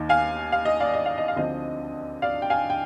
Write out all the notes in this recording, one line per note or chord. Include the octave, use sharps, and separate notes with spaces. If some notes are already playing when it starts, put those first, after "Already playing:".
Already playing: D#2 D#3 A#3 D#4
F5 G#5
F5
D#5
D5 F5
D#5
F5
D#5
F5
D2 D3 F3 C4 D#4 D#5
D5 F5
G5
F5 G#5
G5